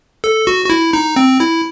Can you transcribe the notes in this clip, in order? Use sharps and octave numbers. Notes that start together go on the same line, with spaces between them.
A4
F#4
F#4
E4
D#4
C4
E4